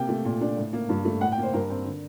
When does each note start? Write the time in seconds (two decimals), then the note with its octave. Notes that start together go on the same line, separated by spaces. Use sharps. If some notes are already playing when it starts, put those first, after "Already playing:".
Already playing: C3 A#3 G5
0.09 A3
0.25 A#2
0.41 D4
0.57 A2
0.73 A#3
0.89 G2
1.05 A3
1.21 A2 F#5
1.32 G5
1.38 A#3
1.43 C5
1.53 G2 A#4
1.70 C4
1.85 D3